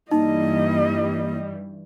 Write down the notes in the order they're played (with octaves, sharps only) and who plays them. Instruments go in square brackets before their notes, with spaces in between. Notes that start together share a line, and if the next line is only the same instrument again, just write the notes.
[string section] G2 E3 G3 [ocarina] A#3 [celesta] D#4 [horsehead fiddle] E4 D#5